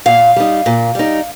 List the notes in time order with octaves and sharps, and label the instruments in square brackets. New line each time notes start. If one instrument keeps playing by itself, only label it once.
[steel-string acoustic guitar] A#2 F5
G3 D#4
A#2
G3 D#4